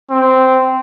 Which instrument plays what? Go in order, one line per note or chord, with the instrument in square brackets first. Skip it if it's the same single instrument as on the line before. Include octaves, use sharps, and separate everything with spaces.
[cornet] C4